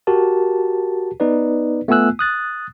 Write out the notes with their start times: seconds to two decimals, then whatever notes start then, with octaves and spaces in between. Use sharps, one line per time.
0.07 F#4 G4 A#4 A5
1.20 B3 D#4 B4 D5
1.88 A3 B3 F4 G#5 E6 F#6
2.19 D#6 F#6 A6